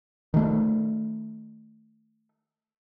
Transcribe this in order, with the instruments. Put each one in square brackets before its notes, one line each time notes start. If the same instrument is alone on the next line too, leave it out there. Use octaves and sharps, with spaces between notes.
[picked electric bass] D#3 A3